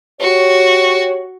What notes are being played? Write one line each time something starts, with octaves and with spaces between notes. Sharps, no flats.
F#4 G4 C#5